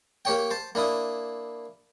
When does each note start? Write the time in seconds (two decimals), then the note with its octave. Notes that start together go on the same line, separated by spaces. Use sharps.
0.25 A#3 G4 C#5 G5
0.51 C5 A5
0.75 A#3 D4 E4 D#6